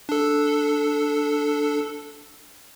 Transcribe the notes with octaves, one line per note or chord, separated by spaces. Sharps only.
D4 A4